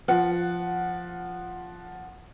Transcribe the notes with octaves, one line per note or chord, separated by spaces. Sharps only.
F3 F#5